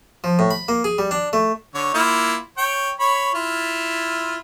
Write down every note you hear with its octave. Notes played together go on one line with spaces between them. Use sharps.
F3
A2
B5
A#3
G#4
G3
D4
A3
D3 C#5
A#3 E4 F4
C#5 G5
C#5 B5
E4 F4